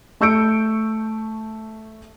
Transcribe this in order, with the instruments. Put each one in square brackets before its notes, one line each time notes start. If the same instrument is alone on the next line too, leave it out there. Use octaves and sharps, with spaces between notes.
[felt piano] A3 C#6 E6 G6 C#7 D7